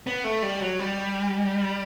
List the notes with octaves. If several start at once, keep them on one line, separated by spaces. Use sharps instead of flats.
B3
A3
G3
F#3
G3